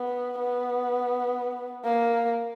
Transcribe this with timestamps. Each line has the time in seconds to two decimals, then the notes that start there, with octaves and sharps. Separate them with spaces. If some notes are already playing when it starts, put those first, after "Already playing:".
Already playing: B3
0.39 B3
1.85 A#3